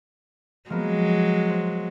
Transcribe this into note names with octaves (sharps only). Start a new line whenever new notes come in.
F3 F#3 G#3 A#3 B3
C5 F#5